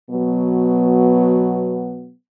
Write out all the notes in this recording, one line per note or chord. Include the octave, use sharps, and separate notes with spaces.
B2 F#3 B3